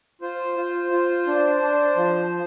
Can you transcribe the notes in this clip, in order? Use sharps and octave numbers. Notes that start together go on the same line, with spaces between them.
F4 C5
F4
F4
D4
D4
F3